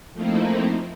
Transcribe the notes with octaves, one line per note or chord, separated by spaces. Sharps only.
F3 A3 A#3 C4 D#4 E4